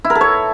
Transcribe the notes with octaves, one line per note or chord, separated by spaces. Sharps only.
E4
A#4
A4
C#5